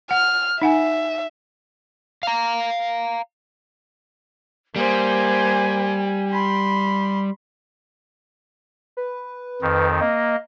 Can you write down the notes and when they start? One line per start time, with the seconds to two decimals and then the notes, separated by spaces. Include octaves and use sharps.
0.11 F#5 F6
0.61 D#4 E5 F#5 G#5
2.23 F5 A#5
4.76 G3 A#3 C5 G#5
6.32 B5 C6
8.97 B4
9.62 F2 D#3
10.00 A#3 D#5